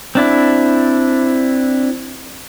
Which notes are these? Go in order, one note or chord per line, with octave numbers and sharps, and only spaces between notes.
C4 D4 E4